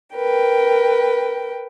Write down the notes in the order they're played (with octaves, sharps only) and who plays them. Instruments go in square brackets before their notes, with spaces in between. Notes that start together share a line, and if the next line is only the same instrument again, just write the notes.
[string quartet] A#4 B4 G5